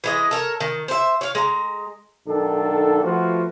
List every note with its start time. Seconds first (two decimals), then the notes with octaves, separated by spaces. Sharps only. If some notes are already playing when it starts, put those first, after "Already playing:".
0.04 E3 G#3 D#5
0.31 A4 A#4 C#5
0.60 D#3
0.88 C5 E5
1.21 C#5 F5
1.35 G#3 A#5
2.27 B1 D#3 D4 A4
3.04 F3 A3 B3 F4 F#4